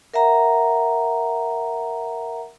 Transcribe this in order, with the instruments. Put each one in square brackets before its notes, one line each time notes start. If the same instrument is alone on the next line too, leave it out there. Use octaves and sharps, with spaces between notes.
[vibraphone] A#4 E5 F#5 A#5